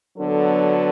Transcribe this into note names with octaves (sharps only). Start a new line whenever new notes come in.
D3 F#3 B3 D4 A4